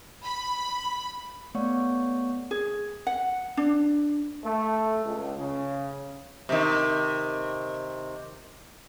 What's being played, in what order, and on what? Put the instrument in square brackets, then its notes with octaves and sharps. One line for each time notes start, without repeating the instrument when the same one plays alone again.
[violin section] B5
[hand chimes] A3 B3 C#5 D5 F#5 C#6
[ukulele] G#4
F#5
D4
[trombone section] A3
C#2
C#3
[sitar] C3 D#3